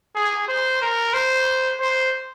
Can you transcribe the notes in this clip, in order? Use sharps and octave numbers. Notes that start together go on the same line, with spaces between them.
G#4
C5
A#4
C5
C5